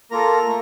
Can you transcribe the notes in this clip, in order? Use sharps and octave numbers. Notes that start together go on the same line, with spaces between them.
A#3 F4 A4 A#4 A#5
A3